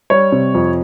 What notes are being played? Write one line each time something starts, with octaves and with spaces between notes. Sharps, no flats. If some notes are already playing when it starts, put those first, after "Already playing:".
G3 C#5
C3
F2